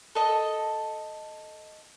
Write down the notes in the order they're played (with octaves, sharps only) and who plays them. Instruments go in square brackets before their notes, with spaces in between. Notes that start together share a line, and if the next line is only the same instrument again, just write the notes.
[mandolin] A4 D#5